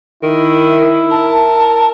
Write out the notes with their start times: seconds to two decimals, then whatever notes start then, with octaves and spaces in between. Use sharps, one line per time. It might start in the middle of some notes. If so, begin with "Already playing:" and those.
0.23 D#3 E4
1.11 A#4 A5